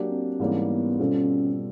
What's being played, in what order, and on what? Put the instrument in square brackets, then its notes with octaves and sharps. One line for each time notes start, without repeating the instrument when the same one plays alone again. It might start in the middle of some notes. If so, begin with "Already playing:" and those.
Already playing: [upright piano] F#3 A#3 D4 G4
[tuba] C4
[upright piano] G#2 E3 G3 A#3 C#4
[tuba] B3
[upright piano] B2 G3 C4 F4 A4 [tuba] C#4